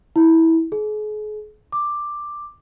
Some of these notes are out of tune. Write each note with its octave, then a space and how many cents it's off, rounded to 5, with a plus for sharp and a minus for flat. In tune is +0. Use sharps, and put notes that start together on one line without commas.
E4 -20
G#4 +40
D6 +5